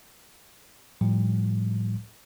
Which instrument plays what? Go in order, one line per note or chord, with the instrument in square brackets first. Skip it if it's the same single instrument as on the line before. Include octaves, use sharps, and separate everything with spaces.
[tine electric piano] A2 F3 G3